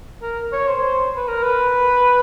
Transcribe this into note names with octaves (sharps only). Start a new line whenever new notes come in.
A#4
C#5
C5
C5
B4
A#4
B4